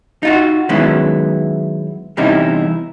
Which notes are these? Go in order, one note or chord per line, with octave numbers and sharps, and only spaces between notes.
D#4 F4 F#4
D#3 F#3 G#3 B3 C#4 E4
E2 C3 G3 C#4 D#4 E4